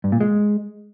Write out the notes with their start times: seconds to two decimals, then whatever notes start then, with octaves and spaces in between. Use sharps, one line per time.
0.04 G2
0.12 A#2
0.21 G#3